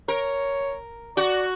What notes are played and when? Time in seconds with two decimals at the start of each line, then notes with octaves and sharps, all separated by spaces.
0.08 A#4 C#5
1.17 F#4 D5